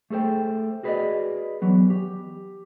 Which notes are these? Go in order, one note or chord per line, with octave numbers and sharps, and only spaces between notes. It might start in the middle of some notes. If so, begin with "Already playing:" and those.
A3 G#4 A4 C5 G5
F#4 G#4 B4 C5 D5 D#5
E3 F#3 B3
G4